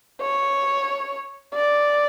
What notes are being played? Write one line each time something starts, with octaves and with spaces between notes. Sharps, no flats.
C#5
D5